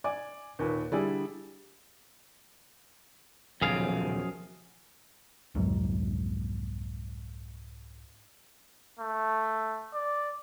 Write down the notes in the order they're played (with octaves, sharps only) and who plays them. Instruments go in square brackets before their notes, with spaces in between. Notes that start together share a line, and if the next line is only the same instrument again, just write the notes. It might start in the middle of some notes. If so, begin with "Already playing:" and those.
[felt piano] D5 G#5 D6
D#2 A#2 B4
D3 G3 E4 G#4 D5
[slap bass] D#1 B1 C#3 [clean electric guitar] F#2 G#4 F5 [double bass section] F3
[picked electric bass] C2 F2 G#2 F#3
[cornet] A3
D5